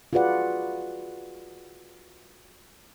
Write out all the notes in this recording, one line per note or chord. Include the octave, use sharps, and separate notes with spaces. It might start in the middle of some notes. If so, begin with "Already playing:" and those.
F4 F#4 G#4 B4 D5 F#5